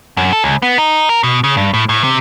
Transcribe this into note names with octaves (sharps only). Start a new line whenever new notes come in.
F#2
A4
C#2
B3
D#4
A#4
B2
C#3
G2
A2
A2
C3